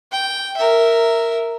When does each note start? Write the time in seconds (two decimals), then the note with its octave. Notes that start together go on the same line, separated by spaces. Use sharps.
0.12 G5
0.57 A#4 E5